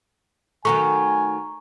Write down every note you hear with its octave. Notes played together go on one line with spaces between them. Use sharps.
D#3 F#3 A3 G#5 A#5 C#6